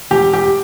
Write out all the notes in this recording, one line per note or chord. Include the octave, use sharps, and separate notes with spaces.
E1 G4
G4